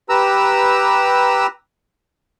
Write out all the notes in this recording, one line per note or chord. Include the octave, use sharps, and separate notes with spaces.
G4 B4 A#5 E6